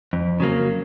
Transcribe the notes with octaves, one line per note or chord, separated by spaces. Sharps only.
F2
C#3 F#3 A#3